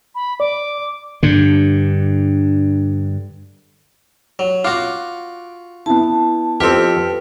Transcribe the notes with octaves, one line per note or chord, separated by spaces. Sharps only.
B5
D5 D6
G2 D3
F#3
F4 F#4 F5 F#5 D6
B3 E4 A5
F2 C4 F4 G4 A4 B4